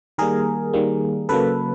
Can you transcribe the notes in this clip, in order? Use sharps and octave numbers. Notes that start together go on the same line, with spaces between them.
D#3 G3 A#3 G#4 A#4
D#3 G3 A#3
C#3 F#3 A#3 A4 B4